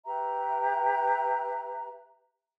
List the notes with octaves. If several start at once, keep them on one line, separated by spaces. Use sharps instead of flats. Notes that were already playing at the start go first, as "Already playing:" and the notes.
G4 B4 E5 A#5